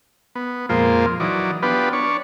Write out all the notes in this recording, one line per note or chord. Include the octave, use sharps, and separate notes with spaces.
B3
F2 A#2 G#3 A#3 F4 C5
E3 F#3 D#4 D5
B3 D4 F4 G4 B4
D4 C#5